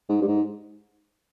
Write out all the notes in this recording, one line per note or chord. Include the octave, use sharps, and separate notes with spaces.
G#2
G2
G#2